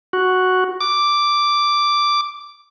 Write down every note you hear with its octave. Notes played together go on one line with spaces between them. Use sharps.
F#4
D6